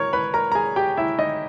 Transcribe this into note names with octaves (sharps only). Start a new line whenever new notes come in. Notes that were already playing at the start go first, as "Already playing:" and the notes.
Already playing: A#4 C#5 C#6
B4 B5
A#4 A#5
A#5
G#4 G#5
G4 G5
E4 E5
D#4 D#5